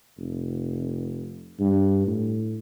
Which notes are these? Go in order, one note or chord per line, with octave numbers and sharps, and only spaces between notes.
F1
G2
A2